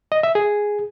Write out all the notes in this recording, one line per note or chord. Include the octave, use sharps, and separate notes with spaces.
D#5
E5
G#4